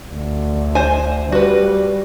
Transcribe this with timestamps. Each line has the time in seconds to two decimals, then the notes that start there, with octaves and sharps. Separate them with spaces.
0.13 D2
0.75 C5 G#5
1.32 G3 F#4 B4